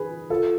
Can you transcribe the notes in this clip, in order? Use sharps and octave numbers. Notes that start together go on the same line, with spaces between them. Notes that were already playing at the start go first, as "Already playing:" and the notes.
Already playing: G#4 B4
F4 A4